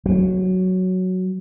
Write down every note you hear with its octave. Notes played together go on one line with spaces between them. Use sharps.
F#3